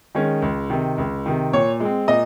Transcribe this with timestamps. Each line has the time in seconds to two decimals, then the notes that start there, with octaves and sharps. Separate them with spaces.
0.15 D#3 G#3 C#4
0.42 C#2
0.70 C3 D#3
0.98 C#2
1.26 C3 D#3
1.53 A#2 C#5
1.80 G#3 C4
2.08 A#2 D#5